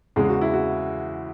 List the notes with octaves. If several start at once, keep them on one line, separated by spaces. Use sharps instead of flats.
E2 C#3 E3 G#3 G#4
F#4
E4
F#4